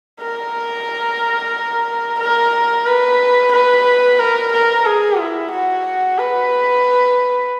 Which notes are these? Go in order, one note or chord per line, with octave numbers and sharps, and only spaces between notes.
A#4
A#4
B4
B4
A#4
A#4
G#4
E4
F#4
B4